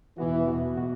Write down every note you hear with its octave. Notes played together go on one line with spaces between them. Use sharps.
E2 B2 E3 B3 F#4
E2 B2 B3 F#4
B2 B3 F#4